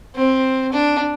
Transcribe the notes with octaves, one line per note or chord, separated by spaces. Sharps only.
C4
D4